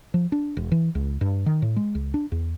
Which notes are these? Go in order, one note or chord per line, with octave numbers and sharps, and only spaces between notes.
F3
D4
E1
E3
C#2
G2
D#3
A2
G#3
C#2
D4
E2